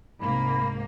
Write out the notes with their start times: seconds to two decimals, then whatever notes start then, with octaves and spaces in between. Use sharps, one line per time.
0.20 C2 G#2 C3 A#3 B5